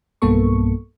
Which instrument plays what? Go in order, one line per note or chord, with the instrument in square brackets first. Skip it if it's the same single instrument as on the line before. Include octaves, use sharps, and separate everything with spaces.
[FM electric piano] B1 G2 A#3 B3 A4 C#6